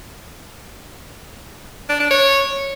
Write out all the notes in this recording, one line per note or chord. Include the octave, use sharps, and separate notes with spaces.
D4
D4
C#5